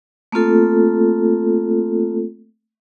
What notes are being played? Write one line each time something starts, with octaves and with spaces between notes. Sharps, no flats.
A3 A#3 C4 F4 A4